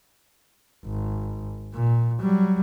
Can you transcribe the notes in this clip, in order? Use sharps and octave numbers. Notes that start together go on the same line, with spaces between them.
G#1
A#2
F#3 G3